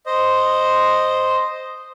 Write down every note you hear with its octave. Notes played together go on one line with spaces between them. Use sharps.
C5 D#5